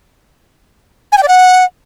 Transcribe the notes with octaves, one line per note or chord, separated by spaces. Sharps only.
G#5
G5
D5
F#5